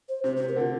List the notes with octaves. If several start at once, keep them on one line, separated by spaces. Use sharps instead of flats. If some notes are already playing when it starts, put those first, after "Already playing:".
C5
C3 C5
C3 C5
A#4
D3 F4